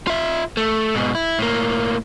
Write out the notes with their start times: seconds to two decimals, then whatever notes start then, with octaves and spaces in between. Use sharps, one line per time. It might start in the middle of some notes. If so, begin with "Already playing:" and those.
0.07 F4 E5
0.57 A3
0.95 G#2 B2
1.15 E4
1.39 A2 A#3